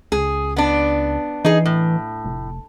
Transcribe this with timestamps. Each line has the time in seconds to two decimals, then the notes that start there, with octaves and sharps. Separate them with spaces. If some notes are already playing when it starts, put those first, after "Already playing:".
0.12 C#2 G#4
0.56 B3 D4
1.45 E3 D#4 G#4
1.66 A2
2.25 F1